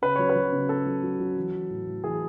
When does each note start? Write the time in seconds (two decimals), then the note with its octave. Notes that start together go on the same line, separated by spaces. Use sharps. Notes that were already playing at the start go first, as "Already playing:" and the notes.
0.02 C#3 B4
0.16 F#3 C#5
0.30 B4
0.35 F#3
0.52 C#3
0.69 C#3 A4
0.86 F#3
1.03 F#3
1.19 F#3
1.36 E3
1.53 E3
1.70 A2
1.87 A2
2.04 E3 G#4